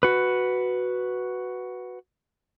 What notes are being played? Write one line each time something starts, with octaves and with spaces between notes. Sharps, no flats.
F#4 B4